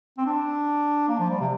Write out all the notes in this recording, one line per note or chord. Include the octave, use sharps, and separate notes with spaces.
C4
D4
A#3
F3
G3
C3